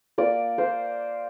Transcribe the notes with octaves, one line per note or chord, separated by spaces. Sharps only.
A#3 D5
A#3 C5